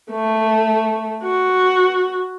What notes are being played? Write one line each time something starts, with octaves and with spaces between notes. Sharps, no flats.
A3
F#4